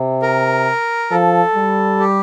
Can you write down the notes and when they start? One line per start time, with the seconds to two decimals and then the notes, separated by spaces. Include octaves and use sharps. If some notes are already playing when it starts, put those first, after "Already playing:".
Already playing: C3
0.22 A#4
1.11 F3 A4
1.56 G3
2.00 G4